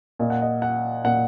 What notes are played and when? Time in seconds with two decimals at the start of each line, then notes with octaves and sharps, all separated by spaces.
0.19 A#2 D#5
0.30 F#5
0.42 D#5
0.62 F#5
1.05 A#2 F#5